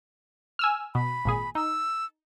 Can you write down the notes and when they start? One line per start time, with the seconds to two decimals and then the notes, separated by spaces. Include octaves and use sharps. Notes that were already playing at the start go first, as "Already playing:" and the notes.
0.59 G#5 E6 F6
0.95 B2 B5
1.25 G#1 A#2 G#4
1.55 D#4 E6